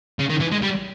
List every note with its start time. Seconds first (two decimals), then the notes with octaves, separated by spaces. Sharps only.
0.19 C#3
0.30 D#3
0.41 E3
0.52 G#3
0.63 G3